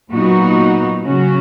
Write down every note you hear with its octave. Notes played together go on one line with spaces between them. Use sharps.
A#2 F#3 B3 D#4 F#4
C#3 F#3 C#4 F#4